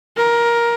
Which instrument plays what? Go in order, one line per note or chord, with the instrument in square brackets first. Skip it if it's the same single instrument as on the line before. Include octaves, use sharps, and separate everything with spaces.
[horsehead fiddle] A#4